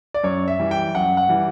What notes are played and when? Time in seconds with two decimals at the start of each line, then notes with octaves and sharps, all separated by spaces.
0.14 D5
0.23 F#2 C#5
0.48 E5
0.59 E3 G3
0.71 G5
0.94 F#2 F#5
1.17 F#5
1.29 E3 G3